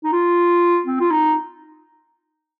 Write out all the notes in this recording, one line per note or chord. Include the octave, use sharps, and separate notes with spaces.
D#4
F4
C4
F4
D#4